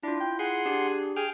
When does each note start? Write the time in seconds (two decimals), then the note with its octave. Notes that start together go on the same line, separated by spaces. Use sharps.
0.03 D4 E4 F4
0.20 G5
0.39 G#4 F#5 C6
0.65 D4 G4
1.16 G#4 G5 F6